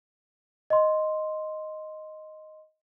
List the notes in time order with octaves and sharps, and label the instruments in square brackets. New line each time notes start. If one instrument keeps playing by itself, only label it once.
[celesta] D#5 C6